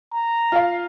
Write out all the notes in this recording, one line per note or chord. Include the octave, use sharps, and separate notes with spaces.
A#5
F4 F5